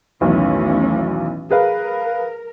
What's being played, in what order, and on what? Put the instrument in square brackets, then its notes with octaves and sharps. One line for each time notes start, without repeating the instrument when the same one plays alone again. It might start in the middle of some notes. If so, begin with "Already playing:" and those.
[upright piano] B1 E2 D#3 [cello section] A2 E3 C#4
[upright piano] G#4 B4 F5 [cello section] A#4